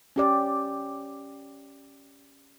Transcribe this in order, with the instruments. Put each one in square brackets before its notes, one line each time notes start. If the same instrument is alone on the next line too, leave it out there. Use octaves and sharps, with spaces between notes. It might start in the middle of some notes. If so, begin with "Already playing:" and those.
[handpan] C#4 G4 D5